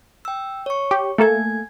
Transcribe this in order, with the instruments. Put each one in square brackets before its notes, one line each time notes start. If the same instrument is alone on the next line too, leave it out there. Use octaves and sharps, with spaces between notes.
[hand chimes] G5 E6
C#5 C#6
[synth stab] G4
[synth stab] A3 A#3 A4 [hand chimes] G#5 G#6